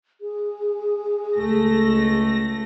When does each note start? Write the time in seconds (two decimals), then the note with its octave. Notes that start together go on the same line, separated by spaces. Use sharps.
0.21 G#4
1.38 C#2 A3 A#6